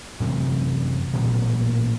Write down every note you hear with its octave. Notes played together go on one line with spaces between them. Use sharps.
F#2 C3 E3 A3
A1 A#2 F#3 B3